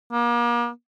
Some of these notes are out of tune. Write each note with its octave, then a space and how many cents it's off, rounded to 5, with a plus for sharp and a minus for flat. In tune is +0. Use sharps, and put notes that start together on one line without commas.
A#3 +35